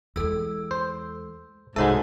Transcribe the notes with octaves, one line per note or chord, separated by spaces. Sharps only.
E2 G#3 A4 E6
C5
C2 G#2 F#4 A4 C#5 E5